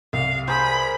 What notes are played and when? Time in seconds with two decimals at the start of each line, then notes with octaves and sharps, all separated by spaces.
0.13 C2 F5
0.48 G#4 A#4 C5 B5